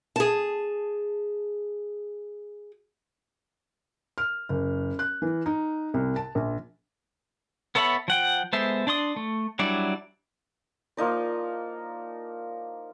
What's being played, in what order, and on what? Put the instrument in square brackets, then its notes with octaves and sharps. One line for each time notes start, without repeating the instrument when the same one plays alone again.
[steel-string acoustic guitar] G#4 A5
[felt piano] F6
F#1
F#6
E3
D#4
C2
A5
A#1
[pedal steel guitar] B3 A4 C#5 E5 B5
F3 F#5 G5
G#3 B3 A4 C5 E5
D4 D5 C6 D#6
A3
F#3 G3 D4 E4 D5
[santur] F3 A#3 D#4 D5